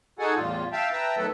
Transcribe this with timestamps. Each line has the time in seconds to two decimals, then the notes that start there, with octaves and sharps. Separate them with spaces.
0.19 D#4 F#4 G#4 A4 F#5 G#5
0.36 E2 A2 G3 F4
0.72 E5 F5 G5 A5
0.92 B4 E5 G5 A5 A#5
1.17 D#3 F#3 A3 B3 A4 B4